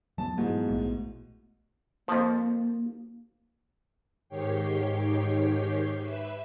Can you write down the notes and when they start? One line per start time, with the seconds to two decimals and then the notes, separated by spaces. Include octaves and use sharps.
0.18 F#3 B3 A5
0.37 A1 G#2 B2
0.68 A#1 A3 B3
2.08 F2 F3 A#3
4.29 G#2 D#3 G4 C#5 G5 C7
6.00 B4 E5 E6